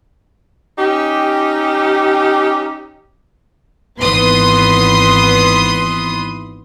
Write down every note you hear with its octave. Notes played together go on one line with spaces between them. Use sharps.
C#4 D#4 G4
G#1 E3 B3 B4 C6 D#6